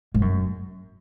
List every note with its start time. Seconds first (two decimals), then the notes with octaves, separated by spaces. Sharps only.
0.14 G#2
0.22 F#2